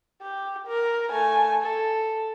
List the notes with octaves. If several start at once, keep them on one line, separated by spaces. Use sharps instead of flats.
G4
A#4
A3 G#5
A4